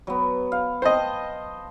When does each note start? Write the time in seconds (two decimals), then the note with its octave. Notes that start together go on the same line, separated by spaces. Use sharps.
0.07 F#3 B3
0.52 F5
0.82 C5 D#5 G5 A5 C6